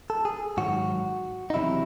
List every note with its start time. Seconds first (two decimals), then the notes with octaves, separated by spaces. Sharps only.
0.10 A4
0.25 G#4
0.57 G#2 D#3 F#3 F#4
1.50 D#4
1.54 E2 C3 D#3 F#3 E4